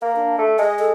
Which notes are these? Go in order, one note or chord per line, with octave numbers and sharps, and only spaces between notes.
A#3 A#4
D4
A3
G#3 D#5
A4